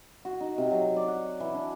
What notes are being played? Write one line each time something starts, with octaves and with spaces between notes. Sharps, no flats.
F#4
D#4
C3
F#3
D5
F#5
E3
D4